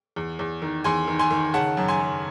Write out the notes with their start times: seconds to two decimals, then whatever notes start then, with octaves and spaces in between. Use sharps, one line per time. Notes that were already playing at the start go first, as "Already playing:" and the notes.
0.16 E2
0.39 E2
0.62 D#3
0.84 E2 G#5 C6
1.07 D#3
1.19 G#5 C6
1.30 D#3
1.54 C#3 F#5 A5
1.77 F#2
1.88 G#5 C6
2.00 F#2